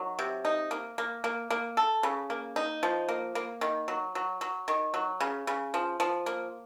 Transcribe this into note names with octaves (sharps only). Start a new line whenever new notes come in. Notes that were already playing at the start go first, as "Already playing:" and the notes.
Already playing: D#3 F#3
C3
D#4
A#3
A#3
A#3
A#3
A4
C#3
A#3
D#4
F3
A#3
A#3
D#3
F#3
F#3
F#3
D#3
F#3
C#3
C#3
F3
F3
A#3